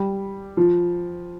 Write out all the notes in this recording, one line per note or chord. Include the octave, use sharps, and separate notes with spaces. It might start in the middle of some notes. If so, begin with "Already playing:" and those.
Already playing: G3
F3